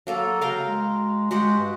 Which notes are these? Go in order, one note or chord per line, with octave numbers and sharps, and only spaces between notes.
F#3 A#3 A4
C#3 A#4 F5 G5
G#3
G#3 F#4 G4 F#5
G2